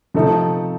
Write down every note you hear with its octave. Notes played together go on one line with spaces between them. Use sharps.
C3 F3 A3 C4 D#4 A4